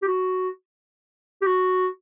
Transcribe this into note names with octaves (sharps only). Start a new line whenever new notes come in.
G4
F#4
G4
F#4